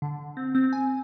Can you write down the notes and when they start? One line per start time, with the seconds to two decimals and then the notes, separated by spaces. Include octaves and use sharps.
0.02 D3
0.37 C4
0.55 C4
0.73 G#5